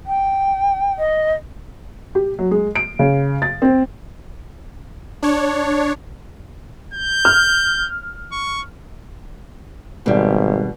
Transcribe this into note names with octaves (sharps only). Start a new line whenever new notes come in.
G5
D#5
G4
F#3
G#3
D7
C#3
A6
C4
D4 C#5
G6
F6
C#6
G#1 B2 G3